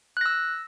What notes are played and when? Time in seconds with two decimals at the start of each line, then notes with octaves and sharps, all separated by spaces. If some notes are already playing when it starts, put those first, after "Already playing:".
0.17 F#6
0.21 A#6
0.26 E6